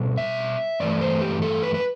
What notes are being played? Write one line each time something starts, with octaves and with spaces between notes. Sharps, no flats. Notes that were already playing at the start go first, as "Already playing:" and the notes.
Already playing: B2 G3
E5
G2 E3 A3 D5
C5
G4
A4
B4
B4